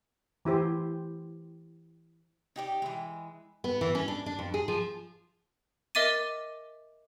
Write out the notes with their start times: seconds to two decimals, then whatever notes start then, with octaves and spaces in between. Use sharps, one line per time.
0.45 E3 E4 G4 C5
2.56 D#4 G4 D5
2.82 E3 G#3
3.64 B3
3.81 E3
3.95 C#4
4.08 D4
4.26 D4
4.39 F2
4.54 G#4
4.68 F3
5.95 A#4 D#5 E5 D6 A6 D#7